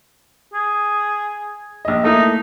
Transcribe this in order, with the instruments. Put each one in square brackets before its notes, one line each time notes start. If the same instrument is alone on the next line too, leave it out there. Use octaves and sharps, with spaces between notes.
[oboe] G#4
[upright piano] A#1 D#5
[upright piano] A3 A#3 E4 [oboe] D#4